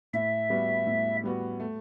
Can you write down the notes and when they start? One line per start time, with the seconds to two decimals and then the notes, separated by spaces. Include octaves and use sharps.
0.13 A2 E5
0.50 G3 B3 F#4
0.86 A2
1.23 G3 B3 F#4
1.60 A3